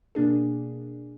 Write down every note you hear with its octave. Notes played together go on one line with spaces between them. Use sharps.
B2 A#3 D4 G#4